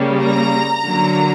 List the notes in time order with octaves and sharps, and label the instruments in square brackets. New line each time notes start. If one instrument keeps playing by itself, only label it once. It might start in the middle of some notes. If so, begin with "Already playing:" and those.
Already playing: [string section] C#3 G3 A#3
A#5
D3 F#3 A#3